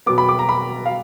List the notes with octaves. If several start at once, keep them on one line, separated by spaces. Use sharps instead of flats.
B2 F#3 B3 D6
B5
D6
A#5
B5
F5